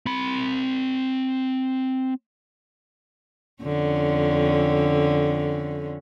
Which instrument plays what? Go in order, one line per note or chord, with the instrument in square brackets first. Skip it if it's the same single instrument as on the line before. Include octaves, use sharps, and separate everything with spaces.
[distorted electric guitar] C4 B5
[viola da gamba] F2 D3 C#4